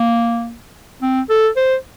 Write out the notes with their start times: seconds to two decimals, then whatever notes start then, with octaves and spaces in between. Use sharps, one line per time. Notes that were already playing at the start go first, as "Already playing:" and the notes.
Already playing: A#3
1.02 C4
1.29 A4
1.56 C5